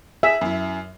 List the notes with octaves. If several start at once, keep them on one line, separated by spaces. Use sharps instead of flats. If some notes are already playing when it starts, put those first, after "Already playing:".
G#4 E5
F#2 E4